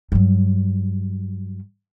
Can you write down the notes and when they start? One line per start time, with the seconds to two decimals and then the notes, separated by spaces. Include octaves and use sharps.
0.12 G2 F#3